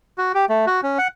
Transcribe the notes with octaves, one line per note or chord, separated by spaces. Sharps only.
F#4
G4
A3
F#4
C#4
F#5